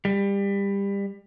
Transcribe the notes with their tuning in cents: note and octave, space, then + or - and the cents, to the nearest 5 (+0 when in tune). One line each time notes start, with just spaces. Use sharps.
G3 +25